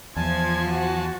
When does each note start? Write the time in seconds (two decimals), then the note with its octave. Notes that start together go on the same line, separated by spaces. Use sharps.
0.17 E2 F3 G#5 A5 G#6
0.70 F#4